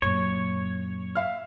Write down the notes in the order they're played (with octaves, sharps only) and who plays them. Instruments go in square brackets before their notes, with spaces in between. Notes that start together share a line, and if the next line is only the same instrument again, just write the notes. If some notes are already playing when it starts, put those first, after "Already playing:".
[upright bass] F#2 A#2 [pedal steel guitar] C#5
[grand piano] E5 F5 F6